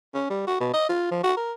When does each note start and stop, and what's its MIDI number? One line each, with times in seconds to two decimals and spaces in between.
0.14 0.27 61
0.30 0.43 55
0.47 0.60 66
0.61 0.73 47
0.74 0.89 75
0.89 1.07 65
1.11 1.19 53
1.23 1.35 66
1.37 1.52 70